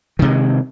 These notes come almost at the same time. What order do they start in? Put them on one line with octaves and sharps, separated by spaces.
D#3 C3 G#3